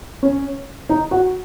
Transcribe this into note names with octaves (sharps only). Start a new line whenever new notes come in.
C#4
D#4
F#4